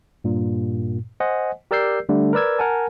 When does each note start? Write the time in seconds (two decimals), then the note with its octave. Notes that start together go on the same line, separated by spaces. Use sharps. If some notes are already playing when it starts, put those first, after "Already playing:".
0.24 G2 A#2
1.20 C5 D#5 F#5 G#5
1.71 G4 A#4 D5 E6 G6 C7
2.09 D3 G3 A3 D4
2.33 A#4 B4 D5 E6 G#6
2.59 A#4 F#5 G#5 A5